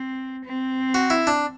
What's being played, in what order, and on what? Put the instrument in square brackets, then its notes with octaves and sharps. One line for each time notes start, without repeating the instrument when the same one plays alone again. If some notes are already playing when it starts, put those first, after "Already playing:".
Already playing: [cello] C4
C4
[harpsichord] F#4
E4
D4